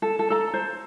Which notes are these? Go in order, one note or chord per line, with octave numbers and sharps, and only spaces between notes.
A4
A4
A4 A#5
C5